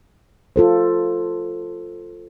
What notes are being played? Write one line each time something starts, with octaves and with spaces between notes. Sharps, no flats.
F4 A4 C5